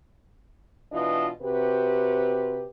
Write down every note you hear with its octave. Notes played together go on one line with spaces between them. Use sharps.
B2 E3 D4 F4 D#5
C3 C4 F#4 G4 B4